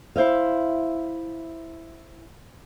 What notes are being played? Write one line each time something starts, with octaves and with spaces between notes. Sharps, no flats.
E4 C5 E5 F5